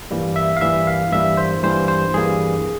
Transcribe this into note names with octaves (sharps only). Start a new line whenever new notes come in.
G2 E3 G3 A#3
E5
F5
G2 E3 G3 A#3 E5
F5
G2 E3 G3 A#3 E5
C5
G2 E3 G3 A#3 C5
C5
G2 E3 G3 A#3 G#4